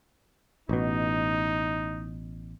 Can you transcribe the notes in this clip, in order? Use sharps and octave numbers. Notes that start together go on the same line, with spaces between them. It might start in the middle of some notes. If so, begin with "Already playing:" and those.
A1 B2 D#4